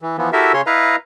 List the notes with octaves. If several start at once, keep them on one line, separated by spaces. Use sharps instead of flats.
E3
E3 F3 B3
E4 F#4 G4 A4 A#4 E5
C#3 C#4 C#5 C6
E4 B4 D#5 F5 A#5